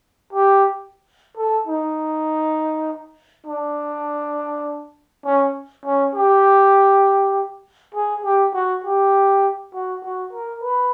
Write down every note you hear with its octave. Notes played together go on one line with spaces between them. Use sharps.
G4
A4
D#4
D4
C#4
C#4
G4
G#4
G4
F#4
G4
F#4
F#4
A#4
B4